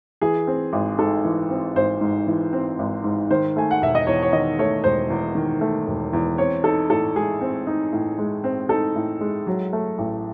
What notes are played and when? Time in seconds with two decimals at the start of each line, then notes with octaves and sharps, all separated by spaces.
0.22 E3 G#4
0.47 C4
0.73 G#1
0.99 G#2 A4
1.25 E3
1.50 C4
1.76 G#1 C5
2.01 G#2
2.27 E3
2.53 C4
2.79 G#1
3.04 G#2
3.31 D#3 C5
3.56 A3 G#5
3.71 F#5
3.81 E1 E5
3.95 D#5
4.07 E2 C#5
4.22 C#5
4.33 D#3 D#5
4.59 A3 C#5
4.84 E1 C5
5.10 E2
5.35 D#3
5.61 A3
5.87 E1
6.13 E2
6.38 C4 C#5
6.64 D#4 A4
6.90 A2 A4
7.16 G#3 G#4
7.41 C4
7.67 D#4
7.92 A2
8.18 G#3
8.44 C4
8.69 D#4 A4
8.96 A2
9.21 G#3
9.47 F#3
9.73 A3
9.98 A1